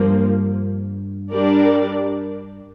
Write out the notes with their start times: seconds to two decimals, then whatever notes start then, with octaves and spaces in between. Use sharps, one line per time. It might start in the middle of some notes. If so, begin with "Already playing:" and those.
Already playing: G2 F3 A#3
1.31 G3 D4 A#4 D5